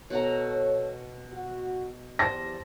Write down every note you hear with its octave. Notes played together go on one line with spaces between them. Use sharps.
B2 A4 C#5 F#5 A#5
F#4
E2 G3 C5 A5 A#6